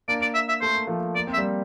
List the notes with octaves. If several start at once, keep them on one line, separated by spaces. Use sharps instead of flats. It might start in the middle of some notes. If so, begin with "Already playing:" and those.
A#3 D4 D5
D5
E5
E5
A3 C5
A#3
F3 A3
A#3 D5
C4
E5
G3 A#3